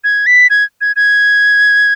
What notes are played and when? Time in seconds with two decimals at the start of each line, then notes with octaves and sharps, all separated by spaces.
0.04 G#6
0.26 B6
0.50 G#6
0.81 G#6
0.96 G#6